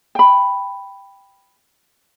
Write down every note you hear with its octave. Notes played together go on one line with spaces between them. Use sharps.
G5 B5